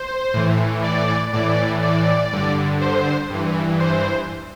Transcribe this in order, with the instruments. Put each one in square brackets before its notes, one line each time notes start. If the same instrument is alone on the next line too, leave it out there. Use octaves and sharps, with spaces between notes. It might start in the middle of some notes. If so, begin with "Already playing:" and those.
Already playing: [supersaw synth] C5
A2 E3
D5
A2 E3 D5
D5
G2 D3
C5
G2 E3
C5